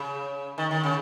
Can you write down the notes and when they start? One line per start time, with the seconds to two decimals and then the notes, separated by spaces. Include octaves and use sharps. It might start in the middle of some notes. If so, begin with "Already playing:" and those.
Already playing: C#3
0.58 D#3
0.71 D#3
0.84 C#3